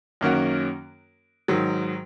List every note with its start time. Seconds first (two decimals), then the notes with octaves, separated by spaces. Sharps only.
0.21 F#2 D#3 A#3 C#4 F#4
1.48 G#2 D#3 F#3